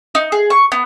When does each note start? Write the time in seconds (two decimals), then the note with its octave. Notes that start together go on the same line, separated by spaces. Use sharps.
0.15 D#4
0.32 G#4
0.50 C#6
0.72 B3